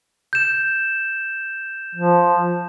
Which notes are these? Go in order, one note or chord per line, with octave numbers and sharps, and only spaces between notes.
G6 E7
F3